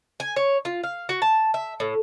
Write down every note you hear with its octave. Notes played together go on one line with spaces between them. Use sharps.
G#5
C#5
F4
F5
F#4
A5
E5
A2